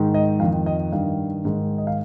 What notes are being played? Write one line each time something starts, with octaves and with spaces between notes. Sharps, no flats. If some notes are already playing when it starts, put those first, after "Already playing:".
Already playing: G#2 D#3
D#5
F2 D#3 F5
D#5
G2 D#3 F5
G#2 D#3
D#5
F5